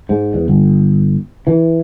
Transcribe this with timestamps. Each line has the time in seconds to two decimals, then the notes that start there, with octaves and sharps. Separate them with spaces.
0.09 G#2
0.34 E2
0.48 G1
1.47 E3